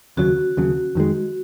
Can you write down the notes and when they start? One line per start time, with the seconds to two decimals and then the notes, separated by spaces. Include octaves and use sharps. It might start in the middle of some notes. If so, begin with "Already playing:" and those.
0.17 D#2 C#3 F#3 F#4
0.57 D#2 C#3 F#3
0.95 F2 D#3 G#3